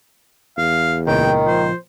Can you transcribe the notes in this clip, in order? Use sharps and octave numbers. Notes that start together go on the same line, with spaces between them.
E2 F5
C#2 A#2 D#3 G5
F3 C5